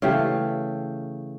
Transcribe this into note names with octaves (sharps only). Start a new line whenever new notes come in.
C#3 E3 A3 G4